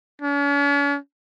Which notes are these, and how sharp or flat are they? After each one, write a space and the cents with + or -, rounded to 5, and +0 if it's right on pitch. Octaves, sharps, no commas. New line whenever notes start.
C#4 +45